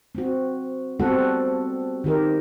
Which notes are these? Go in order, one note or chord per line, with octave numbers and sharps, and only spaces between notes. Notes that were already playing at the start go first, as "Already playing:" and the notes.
C4 F#4
G3 B3 C4 F#4 A4 F#5
D#3 G4 A#4